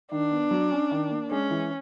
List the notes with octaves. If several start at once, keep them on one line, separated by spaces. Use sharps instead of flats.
D#3 D4
B3
F#3
C#4
D#3
A#3
G#3 C#4
E3